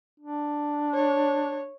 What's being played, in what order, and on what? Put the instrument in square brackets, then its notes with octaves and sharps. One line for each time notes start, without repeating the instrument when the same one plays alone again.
[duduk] D4
[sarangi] C#5